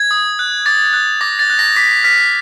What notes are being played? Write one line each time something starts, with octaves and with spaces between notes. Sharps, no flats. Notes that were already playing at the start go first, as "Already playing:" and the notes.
Already playing: G#6
D#6
F#6
D6 A6
F#6
D6 A#6
A6
F#6
A#6
D6 B6
F6 B6